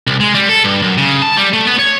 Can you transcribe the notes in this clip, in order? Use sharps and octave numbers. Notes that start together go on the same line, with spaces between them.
C2
G#3
G3
A4
G2
F#2
C#3
A5
G3
A3
B3
C#5